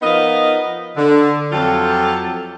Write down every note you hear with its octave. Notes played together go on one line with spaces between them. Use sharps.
F3 B3 D#4 A#4 D#5 F5
D3
F2 F#3 F4 G4 A4